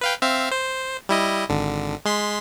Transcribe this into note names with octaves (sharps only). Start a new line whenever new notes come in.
B4 F5 G5
C4 E5 F5
C5
G3 E4 D#5
G#1 D3
G#3 C6 B6